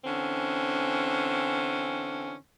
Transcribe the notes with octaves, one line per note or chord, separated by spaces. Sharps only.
D3 E3 C4 C#4